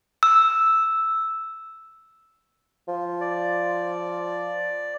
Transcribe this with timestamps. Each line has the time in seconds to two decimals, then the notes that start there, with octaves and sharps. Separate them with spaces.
0.23 E6
2.88 F3
3.21 D5